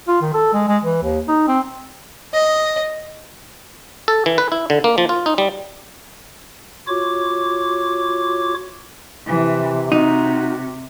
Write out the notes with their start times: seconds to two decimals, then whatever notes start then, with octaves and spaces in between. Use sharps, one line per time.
0.08 F4
0.22 D#3
0.34 A4
0.54 G#3
0.68 G#3
0.83 E3
1.03 D#2
1.28 D#4
1.48 C4
2.34 D#5
4.08 A4
4.26 E3
4.38 B4
4.52 E4
4.70 D3
4.84 A#3
4.98 F3
5.09 F4
5.26 D#4
5.38 G3
6.88 F4 F#4 C#5 D6
9.27 C3 E3
9.92 C3 D#4 F#4